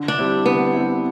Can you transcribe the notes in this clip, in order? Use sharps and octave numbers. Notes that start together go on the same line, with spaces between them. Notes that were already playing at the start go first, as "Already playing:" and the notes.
Already playing: D3
D4
G3 C4 E4
D3 B3
G3 C4 E4